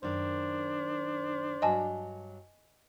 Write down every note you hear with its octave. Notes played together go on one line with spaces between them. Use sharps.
F#2 D#3 D4 C5
G2 F#3 D#5 G#5 A5